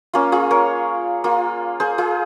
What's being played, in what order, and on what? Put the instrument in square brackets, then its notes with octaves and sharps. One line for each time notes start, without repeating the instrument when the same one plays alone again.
[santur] A#3 C#4 F4
F4 G#4
A#4 C#5
A#3 F4
G#4 C5
F4 G#4